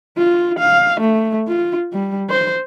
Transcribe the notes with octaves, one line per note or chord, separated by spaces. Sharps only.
F4
F5
A3
F4
G3
C5